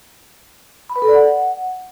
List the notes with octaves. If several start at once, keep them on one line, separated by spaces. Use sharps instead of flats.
B5
B4
A4
D5
F#5